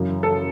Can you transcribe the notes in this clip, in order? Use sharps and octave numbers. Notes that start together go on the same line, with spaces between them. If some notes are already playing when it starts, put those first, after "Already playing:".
Already playing: F#2 C#3 E3
A4